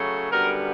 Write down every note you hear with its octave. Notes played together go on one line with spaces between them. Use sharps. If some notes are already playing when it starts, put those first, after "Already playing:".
Already playing: C#3 F#3 A3
F#2 D3 G3 B3 A#4